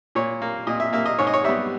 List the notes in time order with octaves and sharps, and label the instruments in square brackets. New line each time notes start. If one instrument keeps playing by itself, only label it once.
[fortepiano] A#2 C#5
A#3
A#2 D#5
E5
A#3 E5
D#5
G#2 C#5
D#5
C#5
G3 B3 E5